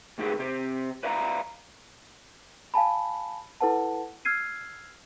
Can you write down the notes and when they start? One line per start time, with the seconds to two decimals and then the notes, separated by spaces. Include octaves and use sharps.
0.18 C#2 A2 D#3 G4 G#4 B4
0.39 C3 C4 G4
1.03 B4 D5 E5 F5 G#5 A#5
2.74 F5 G#5 A5 B5
3.60 E4 A4 B4 F#5 A5
4.25 E6 F6 G#6 C7 D#7